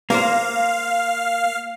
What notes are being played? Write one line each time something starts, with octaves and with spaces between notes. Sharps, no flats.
A#3 A#4 C5 F5